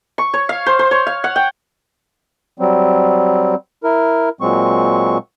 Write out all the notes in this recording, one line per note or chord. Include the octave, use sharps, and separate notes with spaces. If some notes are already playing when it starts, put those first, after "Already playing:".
C#6
C#5
F5
C5
C5
C#5
F5
F#5
G5
F#3 G3 C4
E4 A#4
A#2 F#3 G#3 C4 C#6